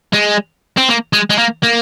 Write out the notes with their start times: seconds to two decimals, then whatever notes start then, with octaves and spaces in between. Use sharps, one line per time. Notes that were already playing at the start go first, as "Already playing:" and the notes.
0.13 G#3
0.77 C4
0.88 A#3
1.13 G#3
1.30 G#3
1.38 A#3
1.63 A#3